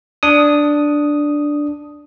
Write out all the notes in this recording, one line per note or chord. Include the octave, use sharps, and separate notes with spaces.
D4 D#6